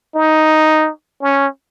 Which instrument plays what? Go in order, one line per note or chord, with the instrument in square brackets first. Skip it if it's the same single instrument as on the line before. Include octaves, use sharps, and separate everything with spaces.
[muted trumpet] D#4
C#4